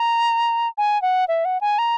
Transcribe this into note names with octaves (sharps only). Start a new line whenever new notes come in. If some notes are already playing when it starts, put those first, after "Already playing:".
Already playing: A#5
G#5
F#5
E5
F#5
G#5
A#5